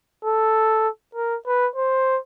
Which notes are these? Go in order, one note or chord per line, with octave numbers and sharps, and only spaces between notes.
A4
A#4
B4
C5